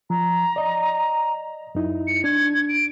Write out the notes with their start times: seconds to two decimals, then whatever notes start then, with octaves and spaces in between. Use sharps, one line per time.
0.10 F3 A#5
0.56 D5 D#5
1.75 F#2 D#4 E4
2.07 C#7
2.24 D4 G#6
2.69 D7